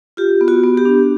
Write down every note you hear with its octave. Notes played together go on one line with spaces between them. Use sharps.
F4 G4
B3
F#4
B3
G4
D4